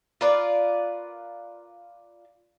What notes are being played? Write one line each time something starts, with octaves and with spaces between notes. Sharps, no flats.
F4 A#4 B4 D5